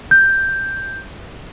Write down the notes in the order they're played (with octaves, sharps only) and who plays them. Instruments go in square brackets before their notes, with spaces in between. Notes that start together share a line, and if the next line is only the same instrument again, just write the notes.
[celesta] G6